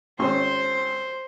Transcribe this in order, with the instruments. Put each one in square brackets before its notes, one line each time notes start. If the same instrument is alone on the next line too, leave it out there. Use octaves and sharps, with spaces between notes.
[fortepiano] G#1 C#4 C#6 [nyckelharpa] C5